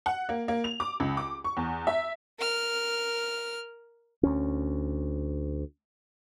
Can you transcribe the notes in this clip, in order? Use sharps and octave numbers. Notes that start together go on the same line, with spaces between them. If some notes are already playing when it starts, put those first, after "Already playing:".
F#5
A#3
A#3
F7
D6
C#2
D6
C#6
E2
E5
A#4 F6
D2 C#4